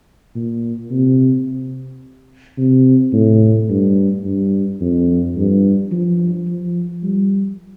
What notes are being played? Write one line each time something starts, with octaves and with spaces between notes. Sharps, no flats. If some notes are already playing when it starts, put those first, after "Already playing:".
A#2
C3
C3
A2
G2
G2
F2
G2
F3
F3
G3